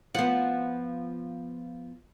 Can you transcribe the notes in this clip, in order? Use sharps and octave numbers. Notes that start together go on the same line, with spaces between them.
F3 B3 F#5